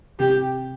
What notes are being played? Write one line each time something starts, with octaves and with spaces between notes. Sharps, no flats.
C3 G4